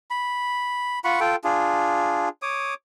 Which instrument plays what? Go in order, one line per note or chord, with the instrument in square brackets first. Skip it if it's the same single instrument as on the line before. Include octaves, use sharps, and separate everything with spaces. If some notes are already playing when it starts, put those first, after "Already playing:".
[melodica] B5
F4 F#5 B5 C#6
F4 A4 G5
D4 F4 G#4
C#5 D6 D#6